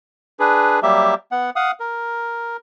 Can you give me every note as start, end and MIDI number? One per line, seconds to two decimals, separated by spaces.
0.40 0.79 62
0.40 0.79 68
0.40 0.79 71
0.83 1.14 54
0.83 1.14 55
0.83 1.14 58
0.83 1.14 67
0.83 1.14 76
1.31 1.50 59
1.31 1.50 78
1.56 1.71 77
1.56 1.71 78
1.56 1.71 87
1.80 2.57 70